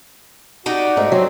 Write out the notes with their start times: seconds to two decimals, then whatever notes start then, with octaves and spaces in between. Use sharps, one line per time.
0.66 D#4 F#4 G4 D5
0.97 G#2 A3
1.12 F#3 C4